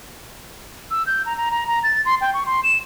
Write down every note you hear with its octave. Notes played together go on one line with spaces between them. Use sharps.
E6
G6
A#5
A#5
A#5
A#5
A6
C6
G5
C#6
C6
E7